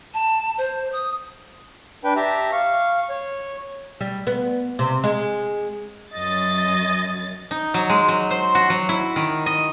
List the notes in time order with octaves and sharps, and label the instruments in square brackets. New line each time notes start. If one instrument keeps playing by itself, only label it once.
[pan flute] A5
C5
D#6
[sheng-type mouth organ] D4 B4 G5
G4 E5 A5 A#5
F5 C#6
C#5
[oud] G3
B3
C3
G#3
[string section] F#2 A6 [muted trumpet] D#5
[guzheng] D#4
F#3
G#3
F#3
C5
F#4
F#3
E4
D#3
D#5